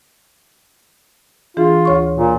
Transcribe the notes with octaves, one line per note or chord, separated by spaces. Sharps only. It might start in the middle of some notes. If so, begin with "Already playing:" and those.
E3 D4 F4 G#4
D2 C#5 C#6
A#2